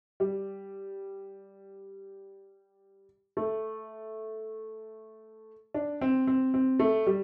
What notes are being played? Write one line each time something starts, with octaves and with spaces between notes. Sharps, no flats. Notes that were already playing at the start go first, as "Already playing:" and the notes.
G3
A3
D4
C4
C4
C4
A3
G3